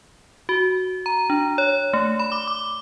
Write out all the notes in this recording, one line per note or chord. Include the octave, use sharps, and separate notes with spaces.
F#4
A#5
D4
C#5
A3
B5
D6
D6